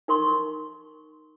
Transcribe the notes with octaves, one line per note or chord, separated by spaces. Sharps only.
D#4 A#4 C6 C#6